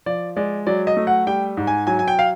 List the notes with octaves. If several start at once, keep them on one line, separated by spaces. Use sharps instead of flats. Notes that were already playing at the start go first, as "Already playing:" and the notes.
F3 D5
G#3 D5
F#3 D5
D#5
A3
F#5
G3 G5
G#2
G#5
F#3 G#5
G#5
G5
F5